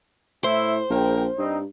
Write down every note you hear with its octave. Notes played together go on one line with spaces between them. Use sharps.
A2 E4 C5 E5
A#1 G#4 A#4 G5
G2 G3 C4 D#4